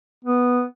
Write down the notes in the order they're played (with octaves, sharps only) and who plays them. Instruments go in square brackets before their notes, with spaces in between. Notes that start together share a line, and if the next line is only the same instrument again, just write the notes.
[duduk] B3